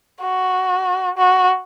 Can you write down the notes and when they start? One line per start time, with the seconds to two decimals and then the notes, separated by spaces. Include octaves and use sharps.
0.21 F#4
1.18 F#4